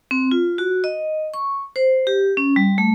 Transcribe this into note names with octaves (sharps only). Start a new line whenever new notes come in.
C4
F4
F#4
D#5
C#6
C5
G4
C#4
G3
A3